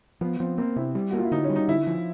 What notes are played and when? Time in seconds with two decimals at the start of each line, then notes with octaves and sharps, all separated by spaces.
0.21 F3 B3
0.40 F3 C4
0.58 A#3 C4
0.76 C3 E4
0.95 G3
1.11 A#3 F#4
1.18 F4
1.25 E4
1.31 D3 D#4
1.44 C#4
1.50 G3
1.56 D#4
1.68 D3 E4
1.87 F3